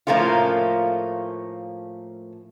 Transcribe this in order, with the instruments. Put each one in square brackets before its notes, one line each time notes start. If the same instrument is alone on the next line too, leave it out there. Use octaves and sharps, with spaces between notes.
[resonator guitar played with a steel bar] A2 F3 A3 A#3 C#4 F4